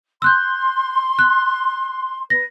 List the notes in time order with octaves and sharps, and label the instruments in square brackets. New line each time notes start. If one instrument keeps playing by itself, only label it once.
[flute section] C6 [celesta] E6 F#6 G6
[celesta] F#6
[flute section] B4 [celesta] A#6